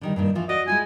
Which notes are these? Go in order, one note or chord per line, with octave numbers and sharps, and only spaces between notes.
D3 D#3 G3
G2 A#2 D#3
E3 F3 F4
F#4 D5 D#5
G#3 E4 F4 G#5